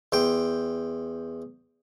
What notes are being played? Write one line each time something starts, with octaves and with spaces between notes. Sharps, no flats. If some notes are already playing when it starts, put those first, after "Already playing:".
E2 C5 G5